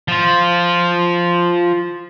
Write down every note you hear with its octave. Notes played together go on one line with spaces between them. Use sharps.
F3 F4